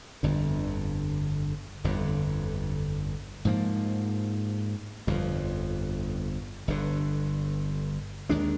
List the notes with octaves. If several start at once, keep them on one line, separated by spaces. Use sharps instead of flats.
G1 F2 D3
G1 F2 D3
G#2 F3 A#3
G1 F2 D3 F3
G1 G2 D3
D#2 D#3 G#3 D4